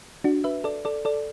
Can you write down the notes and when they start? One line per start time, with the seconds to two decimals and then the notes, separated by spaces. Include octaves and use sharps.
0.24 D4 F#4
0.44 B4 E5
0.64 A4 D5
0.85 A4 D5
1.05 A4 D5